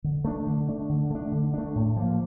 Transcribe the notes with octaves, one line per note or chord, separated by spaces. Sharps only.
D3
A3 D4
D3
A3 D4
D3
A3 D4
D3
A3 D4
A2
F3 A#3